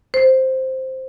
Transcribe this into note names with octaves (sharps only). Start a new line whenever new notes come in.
C5